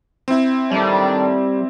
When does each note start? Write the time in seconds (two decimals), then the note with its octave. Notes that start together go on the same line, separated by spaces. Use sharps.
0.28 C4 E4
0.71 A2 D#3 G3 D4